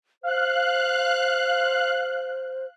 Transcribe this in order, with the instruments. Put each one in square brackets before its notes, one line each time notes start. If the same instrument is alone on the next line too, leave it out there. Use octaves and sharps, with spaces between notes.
[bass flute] C5 [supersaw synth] F5 F#6